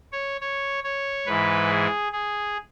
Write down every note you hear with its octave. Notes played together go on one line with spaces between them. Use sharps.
C#5
C#5
C#5
G#2 E3 B4
G#4
G#4